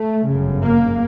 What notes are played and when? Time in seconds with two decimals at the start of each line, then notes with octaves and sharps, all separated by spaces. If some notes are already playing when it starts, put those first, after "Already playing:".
Already playing: A3
0.28 G1 F#2 C#3
0.64 A#3